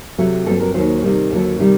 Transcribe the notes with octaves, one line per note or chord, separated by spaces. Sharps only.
C3 F#3 A3 C4
G2 F#3 C4 A4
A#4
D#2 D#3 F#3 C5
C3 D#3 G3
D#2 D3 F#3
C3 D#3 G3